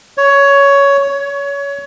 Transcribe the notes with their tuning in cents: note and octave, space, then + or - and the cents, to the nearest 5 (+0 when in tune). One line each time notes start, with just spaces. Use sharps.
C#5 +15
C#5 +25